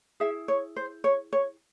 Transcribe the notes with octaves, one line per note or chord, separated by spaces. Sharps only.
E4 G#4 E5
C#5
C5
C#5
C#5